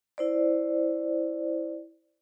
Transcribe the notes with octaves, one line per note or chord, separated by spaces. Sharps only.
E4 C5 D5